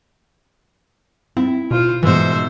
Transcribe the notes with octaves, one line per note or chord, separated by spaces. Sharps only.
C4 E4
B2 F4 C5
G#2 B2 E3 C5 E5